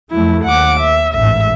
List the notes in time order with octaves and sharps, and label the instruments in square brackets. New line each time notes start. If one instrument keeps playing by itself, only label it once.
[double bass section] F2 F#3 A3 [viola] E4
[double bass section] D#2 [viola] F#5 D6
[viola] E5
[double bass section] A1 G#2 [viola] E5